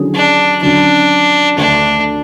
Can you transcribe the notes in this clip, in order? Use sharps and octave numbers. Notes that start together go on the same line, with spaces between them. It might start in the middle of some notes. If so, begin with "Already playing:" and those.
Already playing: D3 F#3 C#4 E4 G#4
D4
D3 F#3 C#4 D4
D2 D3 A3 D4